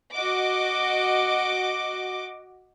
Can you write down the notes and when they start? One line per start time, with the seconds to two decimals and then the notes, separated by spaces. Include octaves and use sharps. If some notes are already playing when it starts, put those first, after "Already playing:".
0.13 F#4 D#5 D6